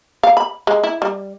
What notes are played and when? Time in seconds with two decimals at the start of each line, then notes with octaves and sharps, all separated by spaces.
0.23 F5
0.37 B5
0.67 G#3
0.83 E4
1.02 G3